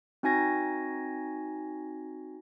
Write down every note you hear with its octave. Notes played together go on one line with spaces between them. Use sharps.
C4 D#4 F#4 G#5 G#6 A#6